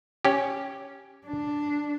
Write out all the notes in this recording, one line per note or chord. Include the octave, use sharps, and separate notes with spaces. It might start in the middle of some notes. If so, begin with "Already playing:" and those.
C#4 G4
D4